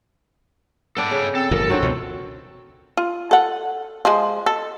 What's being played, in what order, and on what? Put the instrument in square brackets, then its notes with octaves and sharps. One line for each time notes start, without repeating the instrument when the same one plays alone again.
[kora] B3 D4 [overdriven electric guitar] A4 G5
[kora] C#3
[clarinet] C4 [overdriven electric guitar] A4
[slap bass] G1 A#2 F3 [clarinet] A#4
[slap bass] F#2 D4 [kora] F#3 C4 [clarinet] F#4
[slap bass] C#2 B2 F3
[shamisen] F4
A4 F#5
F3 G#3
A4